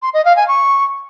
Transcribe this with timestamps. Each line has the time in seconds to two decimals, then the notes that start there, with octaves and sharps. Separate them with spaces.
0.02 C6
0.14 D#5
0.25 F5
0.36 G#5
0.48 C#6